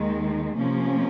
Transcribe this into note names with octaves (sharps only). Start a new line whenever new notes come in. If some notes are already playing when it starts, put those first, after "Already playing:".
Already playing: D#2 D#3 G#3
C3 F3 A#3 C#4